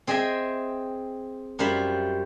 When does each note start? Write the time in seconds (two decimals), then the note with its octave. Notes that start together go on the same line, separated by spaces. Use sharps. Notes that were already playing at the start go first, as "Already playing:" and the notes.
0.07 C4 G#4 D#5 E5 G5
1.59 F#2 G3 F4 C5 E5 B5